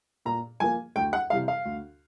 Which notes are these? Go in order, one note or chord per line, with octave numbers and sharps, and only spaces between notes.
A#2 A#5
F3 A#3 G#5
D2 G5
F#5
C3 E3 G3 F5
F5
D2